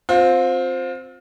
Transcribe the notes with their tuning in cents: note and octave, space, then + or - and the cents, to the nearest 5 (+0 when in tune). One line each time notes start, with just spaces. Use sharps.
C4 +0 F4 +30